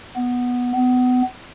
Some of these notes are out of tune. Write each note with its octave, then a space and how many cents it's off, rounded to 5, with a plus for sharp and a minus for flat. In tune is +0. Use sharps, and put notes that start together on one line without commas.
B3 -5
B3 +25